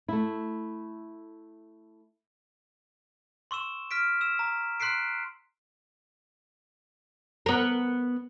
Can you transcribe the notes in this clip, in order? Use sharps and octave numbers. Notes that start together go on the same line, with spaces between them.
A3 E4
C6 C#6 E6 E7
F6 B6 D7
E6 E7
A#5
C6 F#6 B6 C7 D7
B3 A#4